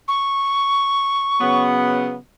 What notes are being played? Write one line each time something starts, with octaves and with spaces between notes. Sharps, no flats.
C#6
C#3 F#3 B3